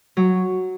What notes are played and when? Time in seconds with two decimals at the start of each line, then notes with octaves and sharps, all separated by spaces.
0.17 F#3